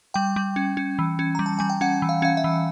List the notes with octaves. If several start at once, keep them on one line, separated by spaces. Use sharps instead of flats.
G3 G5
G3
C#4
C#4
E3
C#4
G3 A#5
A5
G3 G#5
G5
C#4 F#5
E3
F5
C#4 F5
E5
E3